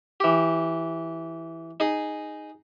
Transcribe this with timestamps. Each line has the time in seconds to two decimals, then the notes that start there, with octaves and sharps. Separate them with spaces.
0.20 E3 G4
1.80 D#4 G#4